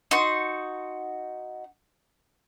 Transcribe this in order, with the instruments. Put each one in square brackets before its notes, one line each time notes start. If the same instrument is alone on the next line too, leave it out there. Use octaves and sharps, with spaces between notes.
[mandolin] D#4 F#4 C6